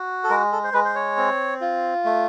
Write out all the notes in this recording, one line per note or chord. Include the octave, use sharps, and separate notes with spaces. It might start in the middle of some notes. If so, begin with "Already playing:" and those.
Already playing: F#4
A4
G#3 A#4
A4
C5
G#3 B4
C5
C#5
C4
F4
A3